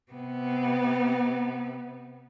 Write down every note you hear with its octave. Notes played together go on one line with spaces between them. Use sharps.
C3 B3